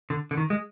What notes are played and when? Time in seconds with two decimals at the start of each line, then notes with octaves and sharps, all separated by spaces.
0.10 D3
0.31 D3
0.37 D#3
0.50 G#3